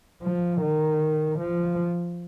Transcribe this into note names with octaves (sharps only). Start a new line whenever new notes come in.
F3
D#3
F3